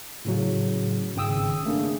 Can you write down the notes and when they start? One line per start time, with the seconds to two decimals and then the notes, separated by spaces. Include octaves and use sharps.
0.25 A2 C#3 F#3
1.16 G#1 C#3 G5 D#6 E6
1.65 A3 A#3 C#4 D4 G#4